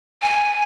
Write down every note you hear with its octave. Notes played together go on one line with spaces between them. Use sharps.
G#5